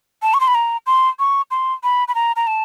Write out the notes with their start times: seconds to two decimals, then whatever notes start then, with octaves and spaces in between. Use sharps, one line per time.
0.22 A5
0.34 C#6
0.40 C6
0.48 B5
0.55 A#5
0.86 C6
1.19 C#6
1.51 C6
1.83 B5
2.08 B5
2.15 A#5
2.36 A#5
2.47 A5